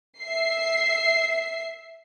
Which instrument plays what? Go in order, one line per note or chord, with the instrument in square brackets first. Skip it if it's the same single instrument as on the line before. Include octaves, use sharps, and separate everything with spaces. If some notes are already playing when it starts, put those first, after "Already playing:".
[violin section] E5 C7